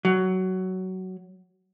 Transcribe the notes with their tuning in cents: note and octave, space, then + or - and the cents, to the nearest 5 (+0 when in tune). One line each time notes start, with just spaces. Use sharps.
F#3 +15